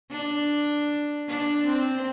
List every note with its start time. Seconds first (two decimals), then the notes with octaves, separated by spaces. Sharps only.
0.11 D4
1.28 D4
1.66 C4